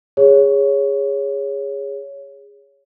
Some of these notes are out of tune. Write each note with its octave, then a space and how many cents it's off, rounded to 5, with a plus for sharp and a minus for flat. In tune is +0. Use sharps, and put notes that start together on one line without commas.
G#4 -20 C#5 +5